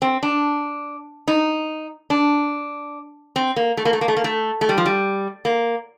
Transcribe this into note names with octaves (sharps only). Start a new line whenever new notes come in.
C4
D4
D#4
D4
C4
A#3
A3
A#3
A3
A#3
A3
A#3
A3
A3
G3
F3
G3
A#3